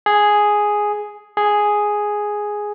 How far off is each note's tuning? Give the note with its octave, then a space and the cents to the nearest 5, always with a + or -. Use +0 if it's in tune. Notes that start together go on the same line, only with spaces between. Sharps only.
G#4 +0
G#4 +0